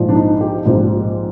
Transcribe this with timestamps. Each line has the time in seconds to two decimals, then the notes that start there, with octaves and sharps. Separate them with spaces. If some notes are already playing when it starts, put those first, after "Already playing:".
Already playing: A#1 G#2 F3
0.09 D4
0.15 D#4
0.41 G4
0.65 A#1 G#2 F3 G4